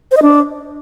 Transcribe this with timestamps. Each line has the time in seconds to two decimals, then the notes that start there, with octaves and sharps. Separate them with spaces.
0.11 C5
0.17 D#5
0.22 D4